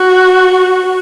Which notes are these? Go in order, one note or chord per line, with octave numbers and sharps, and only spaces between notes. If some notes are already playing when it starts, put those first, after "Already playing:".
Already playing: F#4